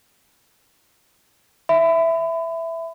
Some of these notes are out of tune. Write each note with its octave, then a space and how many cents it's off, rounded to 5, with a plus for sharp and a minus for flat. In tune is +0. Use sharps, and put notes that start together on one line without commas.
E5 +0 B5 +30